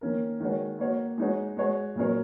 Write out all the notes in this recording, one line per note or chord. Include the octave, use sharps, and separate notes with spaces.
D#3 A#3 C#4 A#4
D#3 G#3 F#4 C#5
A#3 F#4 C#5
G#3 D#4 F#4 C#5
G#3 F#4 C#5
A#2 F#3 C#4 A#4 C#5